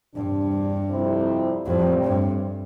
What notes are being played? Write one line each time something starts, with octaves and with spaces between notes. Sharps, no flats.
E2 G2 C3 G3 D4
F2 C3 G3 C4 E4
F2 A2 E3 G3 C4
G2